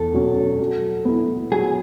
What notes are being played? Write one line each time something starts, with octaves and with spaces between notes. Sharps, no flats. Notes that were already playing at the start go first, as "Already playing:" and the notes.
Already playing: E2 A4
B2 F#3 C#4
F#3
B3 E4
F#3 G#4